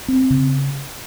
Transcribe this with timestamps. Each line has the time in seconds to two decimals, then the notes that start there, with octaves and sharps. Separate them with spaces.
0.08 C4
0.30 C#3